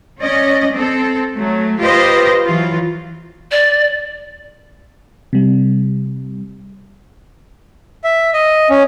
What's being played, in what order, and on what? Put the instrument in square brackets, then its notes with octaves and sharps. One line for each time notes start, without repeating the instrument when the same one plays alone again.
[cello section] C#4 D5 D#5
C4 A4
F#3 A3
F4 G4 B4 C5 D#5
E3 F#3 F4
[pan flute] D5
[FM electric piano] C3 G3
[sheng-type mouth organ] E5
D#5
C#4